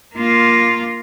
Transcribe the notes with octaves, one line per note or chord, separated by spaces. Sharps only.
A#3 F4